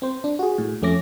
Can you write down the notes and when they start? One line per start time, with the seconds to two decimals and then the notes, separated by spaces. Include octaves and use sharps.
0.02 C4 C5
0.24 D4
0.39 F#4 G#4
0.58 A2
0.82 F2 A3 C#4 D6 A#6